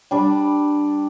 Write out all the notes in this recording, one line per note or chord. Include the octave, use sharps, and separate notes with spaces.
G3 D4